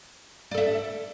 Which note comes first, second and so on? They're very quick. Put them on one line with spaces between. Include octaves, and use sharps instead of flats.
D5 A4 E5